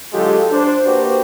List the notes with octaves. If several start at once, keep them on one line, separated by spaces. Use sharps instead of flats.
D3 F#3 G#3 F4 G4 A4
D4 C5
A#3 F#4 G4 B4 C5